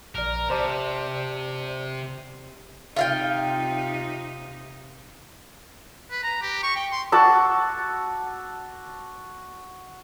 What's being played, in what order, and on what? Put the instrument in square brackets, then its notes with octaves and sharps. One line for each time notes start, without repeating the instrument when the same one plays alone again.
[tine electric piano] A#1 D5 [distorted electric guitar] A#4
[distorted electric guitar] C3 [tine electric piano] C5 D5 A5
[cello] C3 D#4 [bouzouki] F4 F5 G5
[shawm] B4
A#5
G4
C#6
G5
C6
[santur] F#4 A5 D6 E6